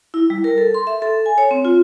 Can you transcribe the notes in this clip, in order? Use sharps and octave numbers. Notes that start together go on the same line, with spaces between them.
E4
G3
A#4
A4
C6
E5
A4
G#5
C#5
C4
F4